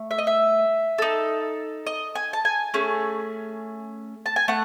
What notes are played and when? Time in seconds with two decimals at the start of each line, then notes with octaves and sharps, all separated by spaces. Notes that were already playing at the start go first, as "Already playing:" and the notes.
Already playing: A3
0.11 E5
0.18 D#5
0.27 E5
0.98 D#4 A4
1.86 D#5
2.15 G#5
2.33 A5
2.45 G#5
2.74 A3 C#4 G#4
4.26 A5
4.36 G#5
4.48 A3 F#5